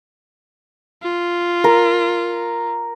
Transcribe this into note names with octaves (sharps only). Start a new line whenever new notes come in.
F4
A#4